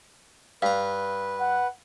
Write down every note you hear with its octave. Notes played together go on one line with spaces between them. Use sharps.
G2 B4 F5 A#5
F#5